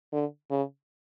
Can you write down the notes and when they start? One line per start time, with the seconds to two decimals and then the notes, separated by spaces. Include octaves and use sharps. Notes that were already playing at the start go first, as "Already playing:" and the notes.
0.13 D3
0.50 C#3